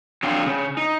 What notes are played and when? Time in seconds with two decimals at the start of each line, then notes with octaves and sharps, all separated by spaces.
0.23 F#3 C4 D4 F5
0.46 C#3
0.77 D#4